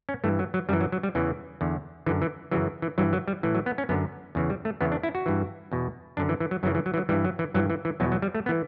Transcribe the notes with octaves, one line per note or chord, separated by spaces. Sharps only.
C#4
G2 E3 A3
F#3
F#3
F#2 E3 G3
F#3
F#3
G3
E2 C#3 E3
E2 D3
F#2 D3 E3
E3
F#2 C#3 E3 F#3
E3
G2 E3 F#3
F#3
G3
A2 E3
F#3
B3
C#4
F#2 D3 B3
E2 C#3 E3
G3
A3
E2 C#3 E3 B3
D4
E4
F#4
G2 E3
E2 B2
F#2 D3 D4
E3
E3
F#3
F#2 C#3 E3 F#3
E3
F#3
E3
F#3
G2 E3 G3
F#3
E3
G2 E3 F#3
E3
E3
E2 B2 F#3
F#3
G3
A3
B3
E3